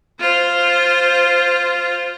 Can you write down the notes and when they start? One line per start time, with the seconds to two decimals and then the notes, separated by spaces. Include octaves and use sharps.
0.20 F4 C5